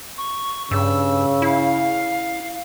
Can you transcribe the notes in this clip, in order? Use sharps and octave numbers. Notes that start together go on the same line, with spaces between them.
C#6
G2 C#3 E6
E4 F5